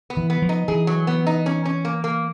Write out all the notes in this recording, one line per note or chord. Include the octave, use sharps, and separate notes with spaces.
B3
E3
B3
F3
D#4
E3 G#4
F#3
B3
D#4
C#4
C#4
A#3
A#3